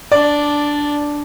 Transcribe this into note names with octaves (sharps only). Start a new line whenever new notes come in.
D4 D5